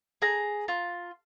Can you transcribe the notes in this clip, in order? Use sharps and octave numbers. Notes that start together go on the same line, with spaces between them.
G#4 A#5
F4